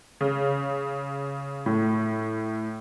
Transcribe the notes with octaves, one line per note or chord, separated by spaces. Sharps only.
C#3
A2